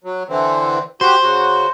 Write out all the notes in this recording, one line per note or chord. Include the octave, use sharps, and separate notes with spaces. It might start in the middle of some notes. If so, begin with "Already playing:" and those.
F#3
D3 E3 C4
F#4 G4 C5
C#3 F#4